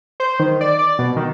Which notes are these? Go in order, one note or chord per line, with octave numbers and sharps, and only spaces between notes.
C5
D#3
D5
D5
B2
D#3